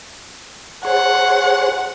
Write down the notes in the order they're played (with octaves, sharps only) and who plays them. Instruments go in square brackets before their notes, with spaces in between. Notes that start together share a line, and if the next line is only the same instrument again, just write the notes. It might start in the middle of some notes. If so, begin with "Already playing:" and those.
[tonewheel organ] G#4 C5 C#5 [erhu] F#5